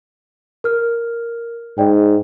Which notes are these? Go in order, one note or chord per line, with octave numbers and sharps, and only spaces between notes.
A#4 F6
G#2 D5 G5